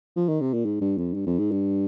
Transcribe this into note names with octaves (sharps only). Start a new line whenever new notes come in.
F3
D#3
C3
A#2
G#2
G2
F2
G2
F2
G#2
G2